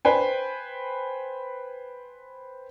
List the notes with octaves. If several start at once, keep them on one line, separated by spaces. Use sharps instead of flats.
B4 C5 G5 G#5